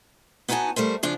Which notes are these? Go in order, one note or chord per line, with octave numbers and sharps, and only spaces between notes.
B3 D#4 F#4 C#5 G#5 A5
G3 A3 A#4 C5
C#3 F3 D4 C5